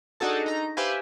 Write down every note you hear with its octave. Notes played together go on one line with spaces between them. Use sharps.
D4 D#4 F#4 G#4 A4 A5
D#4 A#5
G4 B4 C5 E5 F5 G#5